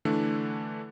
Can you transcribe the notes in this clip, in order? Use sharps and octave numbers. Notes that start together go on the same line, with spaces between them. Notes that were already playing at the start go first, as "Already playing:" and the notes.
D3 E3 A3 D4